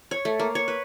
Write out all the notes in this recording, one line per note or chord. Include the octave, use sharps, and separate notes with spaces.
C#5
A3
A#3
C#5
B4